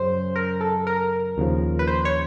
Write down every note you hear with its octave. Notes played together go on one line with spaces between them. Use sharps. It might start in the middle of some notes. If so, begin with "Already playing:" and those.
Already playing: F#2 C#3 C5
A#4
A4
A#4
D#2 C#3 F3
B4
C5
C#5